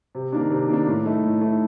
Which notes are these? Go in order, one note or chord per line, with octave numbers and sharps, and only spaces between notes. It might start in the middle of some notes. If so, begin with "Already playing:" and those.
C3
D#3 A#3 D4
C3
D#3 A#3 D4
A2
A3 D#4
A2
A3 D#4